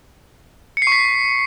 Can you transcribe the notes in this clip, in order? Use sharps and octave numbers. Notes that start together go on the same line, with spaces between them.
C#7
C7
C#6
B6